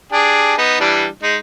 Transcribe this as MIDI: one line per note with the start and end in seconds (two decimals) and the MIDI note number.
0.12 0.54 62
0.12 0.54 67
0.12 0.54 68
0.58 0.76 59
0.58 0.76 63
0.80 1.06 52
0.80 1.06 55
0.80 1.06 62
1.23 1.37 56
1.23 1.37 63